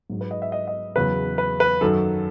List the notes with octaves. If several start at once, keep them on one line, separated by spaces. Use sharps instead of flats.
G#2 F#3
B4
D#5
E5
D#5
D#5
E2 C#3 F#3 B4
B4
B4
F#2 D#3 F#3 A4